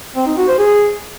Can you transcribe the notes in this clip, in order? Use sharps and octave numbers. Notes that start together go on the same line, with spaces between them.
C4
D#4
F#4
C5
G#4